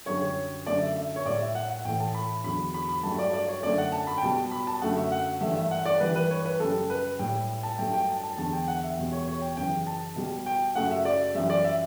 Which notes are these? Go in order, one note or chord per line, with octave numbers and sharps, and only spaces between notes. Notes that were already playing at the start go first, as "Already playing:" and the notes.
F#2 D3 G3 C#5
C#5
F#2 D3 A3 D5
E5
E5
C#5
A2 G3 D5
E5
F#5
F#5
A2 E3 A3 G5
A5
B5
E2 D3 F#3 B5
B5
B5
G2 F#3 A3 A5
D5
D5
C#5
F#2 D3 A3 D5
F#5
A5
B5
G5
B2 G3 A5
B5
A5
F#2 D3 F#3 A3 F#5
E5
F#5
G2 E3 A3 E5
E5
F#5
D5
G2 E3 G3 B4
B4
C#5
B4
F#2 C#3 G3 A4
B4
A2 G3 G5
A5
G2 F#3 A3 G5
G5
A5
A5
E2 D3 G3 A5
G5
F#5
E5
E2 B2 G3
C#5
C#5
G5
F#2 C#3 E3 G5
A5
B2 G3
G5
F#2 C#3 F#3 A3 F#5
E5
D5
F#2 E3 G3 E5
D5
E5